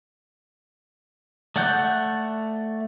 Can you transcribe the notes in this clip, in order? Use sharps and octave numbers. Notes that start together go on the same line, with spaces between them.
A3 D5 F#5 F#6 G6